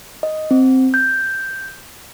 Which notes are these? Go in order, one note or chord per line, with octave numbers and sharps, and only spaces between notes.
D#5
C4
G6